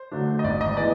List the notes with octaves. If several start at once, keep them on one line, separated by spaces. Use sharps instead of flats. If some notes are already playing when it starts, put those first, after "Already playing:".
Already playing: C5
D3 F#3 A3 D4
D#5
G#1 D5
D#5
E3 G#3 B3 D5